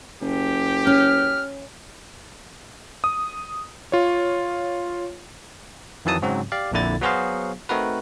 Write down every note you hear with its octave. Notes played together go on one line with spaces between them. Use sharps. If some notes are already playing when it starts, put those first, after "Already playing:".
F#1 G4
C#4 F6
D#6
F4 C#5
F2 D#3 E3 F#3 A5 D#6
G#2 C#3 F#3 C4 F#4
G4 D5 F5
A#1 F2 A#2 D3 E4 A6
F#3 B3 F#4 G#4 C5 F5
A3 C4 D#4 F#4 A#4 B4